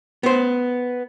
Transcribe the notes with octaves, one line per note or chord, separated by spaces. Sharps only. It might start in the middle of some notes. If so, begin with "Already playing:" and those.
B3 C5